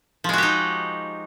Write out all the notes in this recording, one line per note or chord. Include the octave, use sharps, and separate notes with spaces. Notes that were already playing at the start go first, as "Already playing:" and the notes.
F3 G#3 D#4 F#4 G4